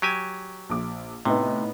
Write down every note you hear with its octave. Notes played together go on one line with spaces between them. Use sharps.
F#3 G4 G#5
A#1 D6
A2 C3 B3 D#4